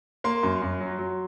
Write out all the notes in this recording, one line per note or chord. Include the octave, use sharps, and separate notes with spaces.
A#3 C6
F#2
F#2
F#3
F#3